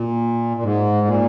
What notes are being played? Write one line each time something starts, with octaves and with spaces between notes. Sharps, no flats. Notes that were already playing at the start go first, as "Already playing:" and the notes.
Already playing: A#2
A#2
G#2
A#2